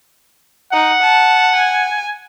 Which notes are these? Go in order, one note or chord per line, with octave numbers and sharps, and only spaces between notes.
D#4 F#5
A5
G#5